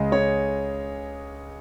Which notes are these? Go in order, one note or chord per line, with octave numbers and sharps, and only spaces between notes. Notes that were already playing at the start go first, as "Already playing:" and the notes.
Already playing: C#2 C#3 G#3 D#5
C#5